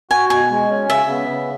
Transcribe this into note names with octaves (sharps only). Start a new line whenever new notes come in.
F#4 G#5
B2 G#5
G#3
C#4
C#3 E5
B3
C#3